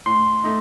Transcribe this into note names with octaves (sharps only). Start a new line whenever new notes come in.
A2 C6
A3 D#4